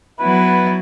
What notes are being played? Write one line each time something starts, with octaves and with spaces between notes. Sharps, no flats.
F#3 B3 E4 B4